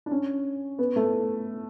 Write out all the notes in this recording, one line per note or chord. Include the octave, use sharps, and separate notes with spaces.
D4
C#4
B3
A3